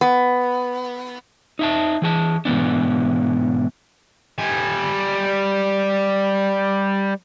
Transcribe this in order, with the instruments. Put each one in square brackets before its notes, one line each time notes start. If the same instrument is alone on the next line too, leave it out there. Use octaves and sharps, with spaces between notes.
[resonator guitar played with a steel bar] B3
[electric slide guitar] D#4 E5 A5
E3 G#4 A5
G#2 B2 E3 B3 D4
[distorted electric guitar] G3 G#5